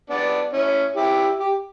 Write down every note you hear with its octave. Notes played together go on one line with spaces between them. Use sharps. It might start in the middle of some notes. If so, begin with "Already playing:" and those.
B3 D4
C#4 E4
E4 G4
G4